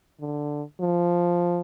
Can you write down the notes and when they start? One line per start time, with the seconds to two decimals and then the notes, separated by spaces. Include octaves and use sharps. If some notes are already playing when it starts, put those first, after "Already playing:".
0.20 D3
0.80 F3